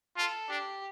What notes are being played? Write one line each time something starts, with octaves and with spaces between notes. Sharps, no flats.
F4 A4
D4 G4